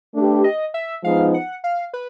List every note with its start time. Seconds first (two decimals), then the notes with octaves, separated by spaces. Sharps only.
0.15 A3 D4 G4 B4
0.44 D#5
0.74 E5
1.04 F3 G#3 B3 D#4 F5
1.34 F#5
1.64 F5
1.93 B4